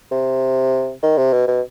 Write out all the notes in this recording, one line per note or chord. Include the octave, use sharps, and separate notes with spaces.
C3
D#3
C3
B2
B2